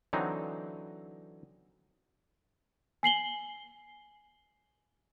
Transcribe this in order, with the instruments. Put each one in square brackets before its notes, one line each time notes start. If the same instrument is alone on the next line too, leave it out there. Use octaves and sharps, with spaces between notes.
[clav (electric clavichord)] D3 E3 F#3 C4 D#4
[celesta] G#5 C7 F#7 G7